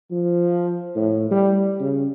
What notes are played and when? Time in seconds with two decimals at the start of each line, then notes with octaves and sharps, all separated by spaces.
0.11 F3
0.95 A2
1.31 G3
1.80 C#3